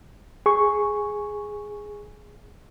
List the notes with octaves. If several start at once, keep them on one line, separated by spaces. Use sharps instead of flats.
G#4 C#6